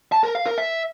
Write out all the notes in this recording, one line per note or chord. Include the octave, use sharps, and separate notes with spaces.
A5
A#4
F5
A#4
E5